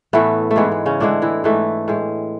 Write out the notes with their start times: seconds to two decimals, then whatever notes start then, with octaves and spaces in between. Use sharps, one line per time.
0.13 A2 E3 A3 B3
0.51 A3
0.56 G#2 E3 G#3 B3
0.71 B3
0.86 C#3 C#4
1.00 A2 D3 E3 G#3 D4
1.22 E3 E4
1.44 G#2 E3 A3
1.88 A2 G#3